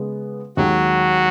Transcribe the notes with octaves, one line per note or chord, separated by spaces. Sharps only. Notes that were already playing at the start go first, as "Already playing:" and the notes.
Already playing: C#3 G#3 B3
D#2 D#3 F#3 G#3 F#4